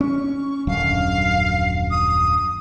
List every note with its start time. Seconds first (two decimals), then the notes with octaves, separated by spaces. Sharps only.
0.01 C#4 C#6
0.67 D#1 F#2 D3 F5
1.90 D#6